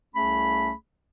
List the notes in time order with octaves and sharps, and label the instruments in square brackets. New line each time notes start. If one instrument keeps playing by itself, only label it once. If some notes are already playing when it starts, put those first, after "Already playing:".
[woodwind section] C2 A3 C#4 G#4 B5